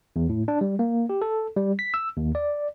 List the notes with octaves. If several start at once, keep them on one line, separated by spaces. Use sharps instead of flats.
E2
A2
D4
G3
A#3
G4
A4
G3
B6
E6
D#2
D5